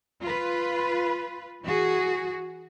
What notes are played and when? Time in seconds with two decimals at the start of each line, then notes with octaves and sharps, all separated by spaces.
0.24 F4 B4
1.63 E3 F#4 G#4